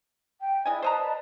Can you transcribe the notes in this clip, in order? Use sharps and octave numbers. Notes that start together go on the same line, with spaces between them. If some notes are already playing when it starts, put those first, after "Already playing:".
G5
G#3 E4 D5 D#5 G#5
B4 C5 D5 D#5 A5 A#5